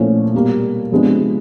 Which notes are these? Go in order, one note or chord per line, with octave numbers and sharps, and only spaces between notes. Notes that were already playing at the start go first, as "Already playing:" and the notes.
Already playing: A#2 F3 A3 C#4 E4
B2 G3 A#3
C3 F3 G#3 B3 D4